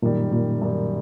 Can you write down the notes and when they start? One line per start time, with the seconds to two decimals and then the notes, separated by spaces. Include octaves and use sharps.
0.02 F#2 A#2 D#3 G3
0.32 A#2
0.62 F#2 D#3 G3